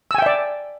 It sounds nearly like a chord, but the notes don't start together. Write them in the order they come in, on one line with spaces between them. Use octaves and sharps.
E6 G#5 G5 E5 D5